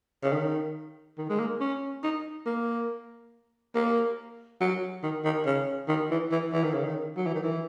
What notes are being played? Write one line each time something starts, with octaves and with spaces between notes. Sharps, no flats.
C#3
D#3
D#3
G#3
A#3
C#4
D#4
A#3
A#3
F#3
D#3
D#3
C#3
D#3
E3
E3
E3
D#3
C#3
D#3
F#3
E3
D#3
E3